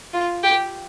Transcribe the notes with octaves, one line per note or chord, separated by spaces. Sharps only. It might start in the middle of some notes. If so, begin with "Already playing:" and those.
F4
G4